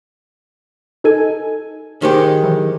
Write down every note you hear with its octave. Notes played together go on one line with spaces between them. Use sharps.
D#4 A4 G#5
D#3 G#3 G4 C5 C#7
E3 F#3